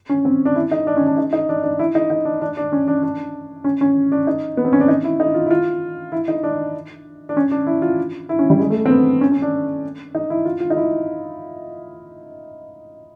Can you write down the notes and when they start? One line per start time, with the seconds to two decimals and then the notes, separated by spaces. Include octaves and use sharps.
0.09 C#4
0.25 C4
0.45 D4
0.56 E4
0.71 D#4
0.87 D4
0.97 C#4
1.07 D4
1.17 D#4
1.33 D#4
1.49 D4
1.64 D4
1.79 E4
1.95 D#4
2.10 D#4
2.25 D4
2.42 D4
2.57 D4
2.72 C#4
2.88 D4
3.03 D4
3.64 C#4
3.81 C#4
4.12 D4
4.27 D#4
4.57 B3
4.65 C4
4.73 C#4
4.80 D4
4.88 D#4
5.04 E4
5.20 D#4
5.34 F4
5.46 E4
5.51 F4
6.12 E4
6.28 D#4
6.43 D4
7.29 D4
7.37 C#4
7.51 D4
7.67 E4
7.82 F4
8.29 E4
8.39 C#4
8.50 G3
8.60 G#3
8.70 A3
8.85 C4
8.90 B3
9.21 C#4
9.32 C#4
9.42 D4
10.15 D#4
10.30 E4
10.45 F4
10.60 F4
10.70 D#4
10.77 E4